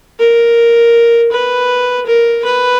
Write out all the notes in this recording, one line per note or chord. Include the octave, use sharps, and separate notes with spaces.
A#4
B4
A#4
B4